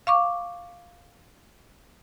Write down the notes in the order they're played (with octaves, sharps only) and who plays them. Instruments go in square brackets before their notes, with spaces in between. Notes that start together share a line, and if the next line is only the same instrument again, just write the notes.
[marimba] F5 C#6 D6